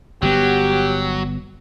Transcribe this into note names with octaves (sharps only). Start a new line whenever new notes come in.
G1 F#3 B3 G4